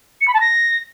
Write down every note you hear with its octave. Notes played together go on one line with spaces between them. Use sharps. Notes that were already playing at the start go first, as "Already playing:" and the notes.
C#7
B5
A5
A#6